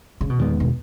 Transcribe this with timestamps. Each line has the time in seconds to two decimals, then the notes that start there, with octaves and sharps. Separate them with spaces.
0.21 C#3
0.30 B2
0.39 E2 A#2 D#3 G#3 B3
0.60 B2